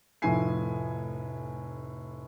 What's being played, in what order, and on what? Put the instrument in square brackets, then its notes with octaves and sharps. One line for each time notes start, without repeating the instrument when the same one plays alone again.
[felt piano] F1 A2 F3 E4 G#5 C7